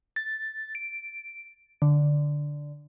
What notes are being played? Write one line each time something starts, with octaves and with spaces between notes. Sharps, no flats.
A6
D7
D3